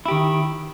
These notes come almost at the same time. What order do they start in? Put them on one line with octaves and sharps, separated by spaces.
E4 G4 D#3